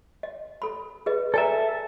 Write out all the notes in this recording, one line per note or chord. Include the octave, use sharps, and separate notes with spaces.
D#5
A4 B5
G#4 B4 D#5
A4 D5 E5 G#5 A#5